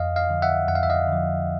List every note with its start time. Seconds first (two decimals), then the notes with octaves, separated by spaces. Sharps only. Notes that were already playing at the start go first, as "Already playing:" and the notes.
Already playing: F2 D#5 F5
0.16 D#5 F5
0.30 D3 F3
0.42 E5 F#5
0.68 F2 F#5
0.75 F5
0.83 E5
0.90 D#5 F5
1.08 D3 F3